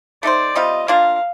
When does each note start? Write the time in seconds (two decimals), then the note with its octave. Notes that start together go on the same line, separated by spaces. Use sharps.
0.23 A3 D#4 A4 C5 D5
0.55 C3 G3 C4 F4 D#5
0.88 A#3 D4 F4 A#4 F5